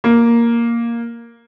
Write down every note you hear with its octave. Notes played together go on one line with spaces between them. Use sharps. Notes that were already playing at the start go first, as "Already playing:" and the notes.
A#3